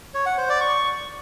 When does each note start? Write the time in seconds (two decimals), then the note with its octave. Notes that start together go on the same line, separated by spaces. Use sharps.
0.14 C#5
0.26 F#5
0.38 C5
0.49 D5
0.61 C#6